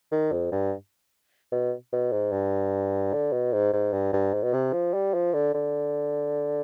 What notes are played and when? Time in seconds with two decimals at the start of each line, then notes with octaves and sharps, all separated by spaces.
0.12 D#3
0.32 F2
0.52 G2
1.52 B2
1.93 B2
2.12 G#2
2.32 G2
3.13 D3
3.33 B2
3.53 G#2
3.73 G#2
3.93 G2
4.13 G2
4.34 G#2
4.43 B2
4.53 C3
4.73 F3
4.94 G3
5.14 F3
5.34 D3
5.54 D3